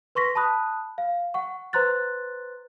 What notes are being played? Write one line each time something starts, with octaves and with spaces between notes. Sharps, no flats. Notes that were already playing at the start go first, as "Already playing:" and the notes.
B4 C6 C#6 A#6 B6
A5 B5 D#6 F#6
F5
F#5 C#6
B4 C5 A#5 C6 F#6 A6